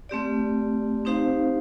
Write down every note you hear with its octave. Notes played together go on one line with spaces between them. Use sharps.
A3 C4 G4 D5
C4 D#4 G4 C5 F5